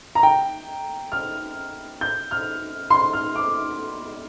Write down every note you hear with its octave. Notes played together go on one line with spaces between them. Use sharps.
A#5
G5
F6
G6
F6
C6
F6
D6